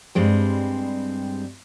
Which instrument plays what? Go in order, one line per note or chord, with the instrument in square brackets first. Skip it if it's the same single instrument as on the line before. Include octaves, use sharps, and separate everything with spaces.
[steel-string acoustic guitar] G2 G3 G#3 C4